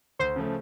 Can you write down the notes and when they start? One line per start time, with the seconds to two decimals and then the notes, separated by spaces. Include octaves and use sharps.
0.19 D2 C5
0.36 C#3 F3 A3